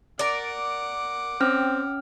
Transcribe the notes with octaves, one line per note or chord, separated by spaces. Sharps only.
A#4 D5 F#5 D6
C4 C#4 F6